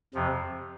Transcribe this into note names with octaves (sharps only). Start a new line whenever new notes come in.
F2 C3 F3